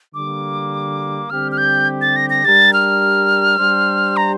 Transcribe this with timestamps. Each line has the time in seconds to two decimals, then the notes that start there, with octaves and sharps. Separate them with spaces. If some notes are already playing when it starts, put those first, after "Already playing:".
0.14 D3 G3 A#3 D6
1.30 D3 G3 C4 G4 F6
1.51 F6
1.58 G6
2.01 A6
2.16 A#6
2.30 A#6
2.45 G3 D4 G4 A#4 A6
2.73 F6
3.59 G3 D4 G4 C5
4.17 A#5